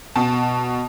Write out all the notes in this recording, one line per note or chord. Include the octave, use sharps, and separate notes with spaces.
B2 A5